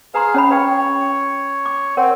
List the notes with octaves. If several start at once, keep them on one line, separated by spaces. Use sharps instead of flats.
G#4 B4 F5 A#5 C6
C#4 C#5 B5
B4 C#5 F5 G5
D6
C4 A#4 C#5 F#5